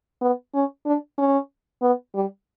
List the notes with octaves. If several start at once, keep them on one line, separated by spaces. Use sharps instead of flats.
B3
C#4
D4
C#4
B3
G3